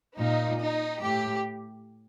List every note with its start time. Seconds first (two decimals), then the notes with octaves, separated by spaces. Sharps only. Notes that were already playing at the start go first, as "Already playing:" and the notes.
0.18 A#2 D#4
0.60 D#4
1.01 A2 G4